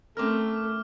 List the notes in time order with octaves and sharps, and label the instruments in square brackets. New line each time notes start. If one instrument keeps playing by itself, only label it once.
[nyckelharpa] A3 [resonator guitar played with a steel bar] C4 C#4 A#4 [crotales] D6 F6